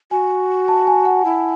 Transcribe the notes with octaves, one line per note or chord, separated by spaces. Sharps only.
F#4 G#5
A5
G#5
F#5
E4